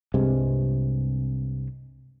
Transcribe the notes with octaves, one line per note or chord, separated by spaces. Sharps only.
C2 G2 C3 G#3